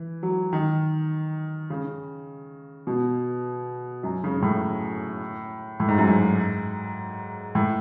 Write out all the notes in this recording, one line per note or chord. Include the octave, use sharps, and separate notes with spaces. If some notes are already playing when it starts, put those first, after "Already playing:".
Already playing: E3
F#3
D#3
C#3
B2
F#2
C#3
A2
A2
G#2
F#2
G#2
A2